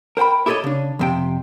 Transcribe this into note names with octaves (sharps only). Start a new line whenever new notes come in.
A#4 C5 F#5 G5 B5
E4 G4 A4 B4 C#5 D#5
C#3 D4
F2 C3 G5